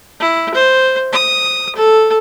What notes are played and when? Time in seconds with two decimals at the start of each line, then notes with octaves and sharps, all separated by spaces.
0.20 E4
0.54 C5
1.13 D#6
1.75 A4